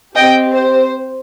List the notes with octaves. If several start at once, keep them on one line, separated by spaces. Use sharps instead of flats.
C4 G4 D#5 G5
C5